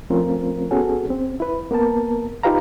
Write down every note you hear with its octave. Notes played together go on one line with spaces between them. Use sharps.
F3 A3 C4 C#4 F4 A#4
B3 C#4 F#4 G#4 A4
C4
E4 B4
A#3 B3 A#4 A5
D#4 F4 G4 B4 F5 A#5